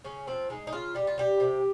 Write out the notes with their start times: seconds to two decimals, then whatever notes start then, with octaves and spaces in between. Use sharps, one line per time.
0.04 C#3 C#4
0.27 F3 C4
0.50 G#3 D#4
0.67 D#4
0.72 C#3 F4
0.95 G3 G4
1.07 F4
1.18 G3 G4
1.40 C3